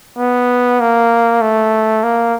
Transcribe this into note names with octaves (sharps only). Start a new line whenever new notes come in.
B3
A#3
A3
A#3